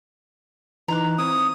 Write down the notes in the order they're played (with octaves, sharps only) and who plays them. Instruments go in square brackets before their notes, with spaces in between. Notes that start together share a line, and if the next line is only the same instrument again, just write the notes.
[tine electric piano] E3 D#4 F#6 [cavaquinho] A#5 C6 D6
[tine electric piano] C4 [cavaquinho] E4 C#5 F5 [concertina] D#6